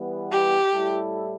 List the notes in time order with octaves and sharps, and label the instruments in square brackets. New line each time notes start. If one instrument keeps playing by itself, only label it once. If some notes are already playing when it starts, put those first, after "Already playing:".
Already playing: [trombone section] E3 G3 B3
[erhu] G4
[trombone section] A2 G3 E4 A4